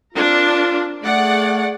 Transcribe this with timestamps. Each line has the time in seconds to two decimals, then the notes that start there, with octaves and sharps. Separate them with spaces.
0.14 C4 D4 F4 A#4
1.03 A3 G#4 D5 F#5